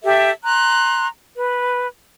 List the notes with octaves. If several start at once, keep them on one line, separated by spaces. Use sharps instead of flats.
G4 A4 E5
A#5 C6 F#6
B4